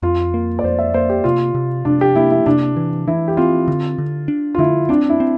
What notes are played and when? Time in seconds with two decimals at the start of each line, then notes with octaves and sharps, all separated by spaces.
0.02 F2 F4
0.34 A#3
0.59 D5
0.64 F2 C5
0.79 E5
0.94 A#3 C5
1.10 G4
1.24 C3 F4
1.55 C3
1.85 C3 D4
2.01 G4
2.16 A#3 E4
2.31 E4
2.46 C3 D4
2.76 E3
3.08 E3 E4
3.28 G4
3.37 C4 F4
3.68 D3
3.98 D3
4.28 D4
4.55 F4
4.58 D3 E4
4.89 C4 D4
5.09 E4
5.20 C4